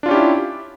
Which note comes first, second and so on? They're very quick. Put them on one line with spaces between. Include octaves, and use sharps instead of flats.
D4 F4 C#4 G4 E4